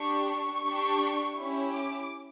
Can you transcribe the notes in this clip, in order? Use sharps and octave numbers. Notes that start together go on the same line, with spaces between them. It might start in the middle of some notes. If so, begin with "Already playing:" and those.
Already playing: D4 G4 C#6
C#6
D4 G4
C#4 E4 G4
D6